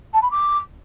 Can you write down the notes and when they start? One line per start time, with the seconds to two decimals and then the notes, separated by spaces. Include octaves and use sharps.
0.13 A5
0.22 B5
0.31 D6